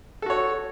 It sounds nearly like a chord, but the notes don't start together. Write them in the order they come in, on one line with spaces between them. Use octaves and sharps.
A4 F#4 C#5